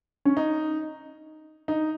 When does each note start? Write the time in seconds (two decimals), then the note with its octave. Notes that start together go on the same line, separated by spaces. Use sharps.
0.25 C#4
0.37 D#4
1.68 D#4